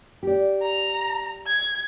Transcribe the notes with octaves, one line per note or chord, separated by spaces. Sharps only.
G4 D5
A#5
G#6